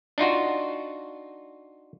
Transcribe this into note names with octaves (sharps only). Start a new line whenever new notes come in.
D4 D#4 F4 F#4